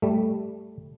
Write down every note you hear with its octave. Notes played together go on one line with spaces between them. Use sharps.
G3 A3